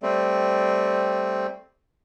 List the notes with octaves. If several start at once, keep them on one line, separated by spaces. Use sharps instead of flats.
G3 A3 C4